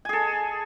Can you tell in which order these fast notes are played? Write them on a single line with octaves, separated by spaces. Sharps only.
G#5 G#4 A4